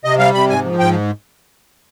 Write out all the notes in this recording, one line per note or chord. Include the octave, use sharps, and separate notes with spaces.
C3 D#5
G3 F5
C3 B5
G#2 G#5
F3
G#2 G5